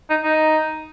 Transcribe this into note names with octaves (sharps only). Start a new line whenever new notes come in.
D#4
D#4